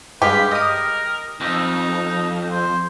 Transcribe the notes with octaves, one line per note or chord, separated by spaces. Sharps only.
G2 G#3 G4 B4 F5
A#4 D#5 D#6
F2 D#4
C5